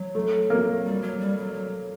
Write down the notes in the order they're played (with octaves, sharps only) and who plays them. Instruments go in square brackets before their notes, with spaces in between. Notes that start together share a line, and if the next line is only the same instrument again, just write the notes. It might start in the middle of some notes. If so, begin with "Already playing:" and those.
Already playing: [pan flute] F#3
[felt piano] A3
A#3
[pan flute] G3
F#3
G3
F#3
F#3